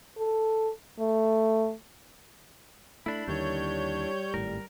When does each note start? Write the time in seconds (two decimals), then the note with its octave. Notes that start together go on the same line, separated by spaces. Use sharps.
0.18 A4
0.99 A3
3.06 A3 D4 E4 B5
3.28 D#2 D3 D#3 G3 C#5 G6
4.34 G#1 A2 A#4